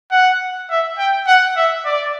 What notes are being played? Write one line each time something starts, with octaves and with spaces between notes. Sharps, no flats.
F#5
E5
G5
F#5
E5
D5